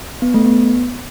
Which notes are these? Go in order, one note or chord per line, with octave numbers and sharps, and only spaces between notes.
B3
A3
B3